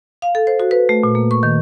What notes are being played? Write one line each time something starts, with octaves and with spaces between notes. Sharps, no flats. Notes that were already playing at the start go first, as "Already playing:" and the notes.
F5
A4
C5
F#4
B4
A3
A#2
A#3
C#6
D#3